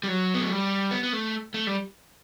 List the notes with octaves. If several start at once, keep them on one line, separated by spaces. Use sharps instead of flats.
G3
F#3
B3
A3
G3
B3
B3
A3
A3
G3